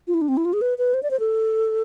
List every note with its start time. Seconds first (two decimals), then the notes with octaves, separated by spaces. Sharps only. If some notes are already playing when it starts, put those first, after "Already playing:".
0.07 F4
0.14 E4
0.21 D4
0.28 C4
0.37 E4
0.45 F4
0.53 G#4
0.61 B4
0.78 B4
0.94 C5
1.03 D5
1.11 C5
1.19 A4